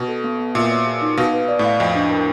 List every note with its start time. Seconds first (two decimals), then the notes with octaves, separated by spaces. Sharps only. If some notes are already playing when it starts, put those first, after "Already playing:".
Already playing: B2
0.08 A4
0.24 B3
0.39 B3
0.55 A#2 E5
0.71 C#5
0.86 G#4
1.02 D#4
1.17 B2 F5
1.33 B4
1.48 D5
1.59 A2
1.65 F5
1.80 F2 D#5
1.95 D4
2.11 A#4